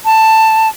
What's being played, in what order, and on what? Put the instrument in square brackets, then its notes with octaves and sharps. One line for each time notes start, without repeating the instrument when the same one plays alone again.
[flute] A5